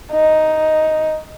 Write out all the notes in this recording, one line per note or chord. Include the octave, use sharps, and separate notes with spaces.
D#4